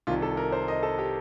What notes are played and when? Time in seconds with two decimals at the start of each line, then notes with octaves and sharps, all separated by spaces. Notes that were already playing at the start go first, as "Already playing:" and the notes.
0.07 C2 C3 D#3 F4
0.22 A4
0.37 A#4
0.52 C5
0.68 D#5
0.83 A4
0.98 G4